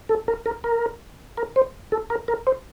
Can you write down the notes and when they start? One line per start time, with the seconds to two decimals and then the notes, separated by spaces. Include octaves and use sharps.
0.09 A4
0.28 A#4
0.46 A#4
0.64 A#4
1.37 A#4
1.56 C5
1.92 A4
2.10 A#4
2.28 A#4
2.47 C5